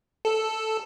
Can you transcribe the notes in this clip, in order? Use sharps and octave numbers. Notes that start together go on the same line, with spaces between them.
A4